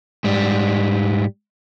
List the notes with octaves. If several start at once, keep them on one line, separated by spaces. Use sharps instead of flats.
G#2 G3